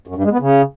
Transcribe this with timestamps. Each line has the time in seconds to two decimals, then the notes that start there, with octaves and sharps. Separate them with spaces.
0.07 F#2
0.16 G2
0.24 G#3
0.32 B3
0.40 C#3